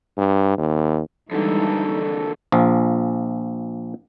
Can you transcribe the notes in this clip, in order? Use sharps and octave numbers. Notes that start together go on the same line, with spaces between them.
G2
D#2
F2 D3 E3 G3 G#3 D#4 A4
A#1 F3